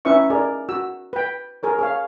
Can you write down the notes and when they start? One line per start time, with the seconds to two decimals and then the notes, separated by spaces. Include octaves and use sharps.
0.05 C#4 D#4 E4 B4 E5 C#6
0.30 D#4 G#4 A#4 D5
0.69 F#4 E6
1.13 B4 G5
1.63 G#4 A#4 C#5
1.79 G#4 C#5 F5